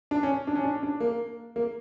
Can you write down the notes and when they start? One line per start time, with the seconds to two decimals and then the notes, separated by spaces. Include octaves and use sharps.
0.11 D4
0.23 C#4
0.47 D4
0.55 C#4
0.64 D4
0.83 D4
1.00 A#3
1.56 A#3